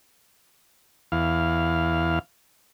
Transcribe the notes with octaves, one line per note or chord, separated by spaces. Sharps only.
E2 F5